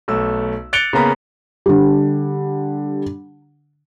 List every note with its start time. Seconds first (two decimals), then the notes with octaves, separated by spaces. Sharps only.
0.08 B1 A3 E6
0.73 F#6 A6 C#7 D7 F7 G7
0.93 C#3 A#3 B3 A#5 B5
1.66 D3 G3